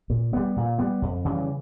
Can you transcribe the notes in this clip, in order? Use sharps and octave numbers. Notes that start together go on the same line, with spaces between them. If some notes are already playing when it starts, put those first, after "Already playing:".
A#2
G3 B3
A#2
G3 B3
F2
C#3 E3 G3